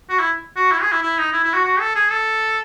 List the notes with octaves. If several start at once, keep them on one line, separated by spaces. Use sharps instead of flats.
F#4
E4
F#4
E4
G#4
E4
E4
D#4
E4
E4
F#4
F#4
A4
G#4
A4